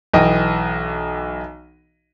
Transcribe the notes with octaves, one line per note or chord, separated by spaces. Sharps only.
B1 E3 D#5 G5